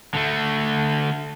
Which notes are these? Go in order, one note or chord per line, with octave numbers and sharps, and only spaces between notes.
D3 A3